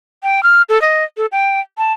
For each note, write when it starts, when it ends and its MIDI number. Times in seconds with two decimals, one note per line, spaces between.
0.23 0.43 79
0.43 0.62 89
0.69 0.80 69
0.82 1.04 75
1.17 1.26 69
1.32 1.60 79
1.78 1.93 81